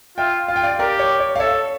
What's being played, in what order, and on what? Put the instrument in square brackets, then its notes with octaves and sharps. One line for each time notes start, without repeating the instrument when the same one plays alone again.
[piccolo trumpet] F4 [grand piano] E5 G5
[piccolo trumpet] F4 [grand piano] F5
[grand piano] G5
D5 F5
[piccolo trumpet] G4 [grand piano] A#4 D5
[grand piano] C#5
C#5
F5
[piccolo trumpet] A4 [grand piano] C#5 E5